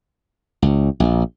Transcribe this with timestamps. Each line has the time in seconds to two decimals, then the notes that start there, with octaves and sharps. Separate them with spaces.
0.62 C#2
1.00 A#1